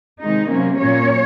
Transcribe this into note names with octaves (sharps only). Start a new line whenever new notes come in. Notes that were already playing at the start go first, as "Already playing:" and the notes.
C3 D#3 G#3 D#4
C3 F#3 A#3 C#4
A#2 F#3 A#3 C#4 C#5